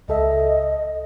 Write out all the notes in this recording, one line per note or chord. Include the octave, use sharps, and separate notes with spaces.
C#2 A4 D#5 E5